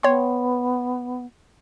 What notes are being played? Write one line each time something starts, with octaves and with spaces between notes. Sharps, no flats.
B3 C#5 G5 C6